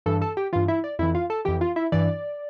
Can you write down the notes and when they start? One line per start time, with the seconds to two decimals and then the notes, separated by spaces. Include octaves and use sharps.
0.06 G2 E3 A4 A5
0.21 A4 A5
0.37 G4 G5
0.53 G2 E3 F4 F5
0.68 E4 E5
0.84 D5
0.99 F2 E3 E4 E5
1.15 F4 F5
1.30 A4 A5
1.45 F2 E3 G4 G5
1.61 F4 F5
1.76 E4 E5
1.92 G2 E3 D5